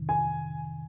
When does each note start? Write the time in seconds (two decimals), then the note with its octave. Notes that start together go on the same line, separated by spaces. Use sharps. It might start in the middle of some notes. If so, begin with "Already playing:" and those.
Already playing: F2 C3 D#3
0.09 G#5